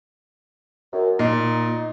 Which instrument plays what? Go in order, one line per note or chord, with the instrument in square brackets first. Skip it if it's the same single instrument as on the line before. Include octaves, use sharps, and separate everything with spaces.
[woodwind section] F#2
[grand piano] A#2 [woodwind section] D#4